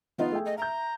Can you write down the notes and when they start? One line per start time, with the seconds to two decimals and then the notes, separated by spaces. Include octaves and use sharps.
0.18 F3 B3 D#4 F4
0.32 A3 G#4 G5
0.46 D#5
0.58 E5 A#5 G6